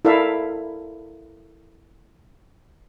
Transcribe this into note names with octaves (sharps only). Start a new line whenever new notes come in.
E4 A4 A#4 D5 E5 F5